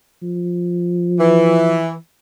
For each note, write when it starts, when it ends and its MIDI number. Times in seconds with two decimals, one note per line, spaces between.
0.23 1.84 53
1.19 1.93 52